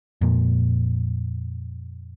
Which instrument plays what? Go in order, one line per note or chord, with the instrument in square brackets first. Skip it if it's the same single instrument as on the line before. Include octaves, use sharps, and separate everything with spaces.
[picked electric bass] F2 A#2